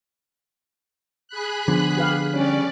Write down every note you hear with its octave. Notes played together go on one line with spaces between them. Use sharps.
G#4 B5 F#6
D3 F3 B3
G4 B4 F5
G3 C#4 D5